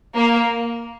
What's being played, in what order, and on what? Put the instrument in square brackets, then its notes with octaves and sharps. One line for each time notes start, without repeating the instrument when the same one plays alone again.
[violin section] A#3